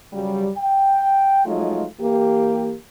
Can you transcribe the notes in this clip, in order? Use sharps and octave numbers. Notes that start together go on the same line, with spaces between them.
F#2 C#3 F#3 G3
G5
F3 F#3 G#3 A3 D#4 F4
E3 A#3 G4